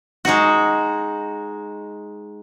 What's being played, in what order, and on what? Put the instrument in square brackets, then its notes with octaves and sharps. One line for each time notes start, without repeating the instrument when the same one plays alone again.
[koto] G#3 D#4 F#4